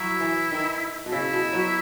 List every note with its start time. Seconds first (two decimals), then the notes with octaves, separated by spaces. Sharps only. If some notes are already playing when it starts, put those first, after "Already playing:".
Already playing: F#3 E4
0.20 E3
0.51 D#3
1.06 B2
1.12 C#3 E4
1.33 B2
1.53 F#3